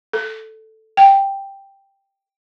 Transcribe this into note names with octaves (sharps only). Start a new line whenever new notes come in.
A4
G5